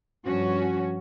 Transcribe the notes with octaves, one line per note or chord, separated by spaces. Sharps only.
G2 F3 C#4 F#4